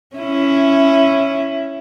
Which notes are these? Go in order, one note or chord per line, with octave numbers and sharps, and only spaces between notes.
C#4 E4